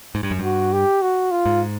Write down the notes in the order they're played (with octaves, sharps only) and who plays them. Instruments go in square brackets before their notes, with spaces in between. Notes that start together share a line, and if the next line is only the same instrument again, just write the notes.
[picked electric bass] G#2
G2
F#2
[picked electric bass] G2 [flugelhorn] F#4
[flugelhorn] G4
F#4
F4
[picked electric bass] G#2